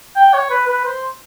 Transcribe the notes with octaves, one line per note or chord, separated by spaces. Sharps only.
G5
C#5
B4
B4
C5